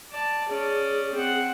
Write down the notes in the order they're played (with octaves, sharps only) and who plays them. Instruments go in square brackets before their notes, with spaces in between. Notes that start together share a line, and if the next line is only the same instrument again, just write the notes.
[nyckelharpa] D5 A5
[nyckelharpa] C#4 D5 [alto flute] G#4
[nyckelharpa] C4 F#5